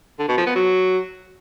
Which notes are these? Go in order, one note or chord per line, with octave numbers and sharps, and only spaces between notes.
D3
B2
F3
B3
F#3